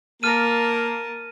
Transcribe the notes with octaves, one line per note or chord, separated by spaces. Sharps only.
A#3 A#4 A5 F6 D#7